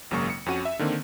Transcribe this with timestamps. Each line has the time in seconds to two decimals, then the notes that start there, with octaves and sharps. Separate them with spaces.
0.11 G#1 F#2 C#3 F#3 A#3 C#6
0.30 C#7
0.46 F2 C#4 F#4 F#5 D#7
0.65 E5
0.79 D3 D#3 A#3 C4